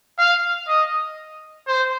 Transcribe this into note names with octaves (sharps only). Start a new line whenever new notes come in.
F5
D#5
C5